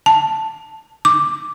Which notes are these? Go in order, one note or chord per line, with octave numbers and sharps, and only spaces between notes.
A5
D6